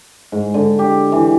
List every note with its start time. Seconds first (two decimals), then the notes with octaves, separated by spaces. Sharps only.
0.32 G#2
0.54 D3
0.79 G4
1.12 E3